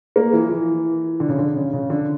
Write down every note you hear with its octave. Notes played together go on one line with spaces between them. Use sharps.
A#3
E3
F3
E3
D3
C#3
D3
C#3
C#3
D3